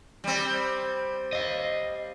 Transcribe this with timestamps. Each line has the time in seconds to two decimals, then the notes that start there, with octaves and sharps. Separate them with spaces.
0.24 G3 C4
1.33 D#5 F5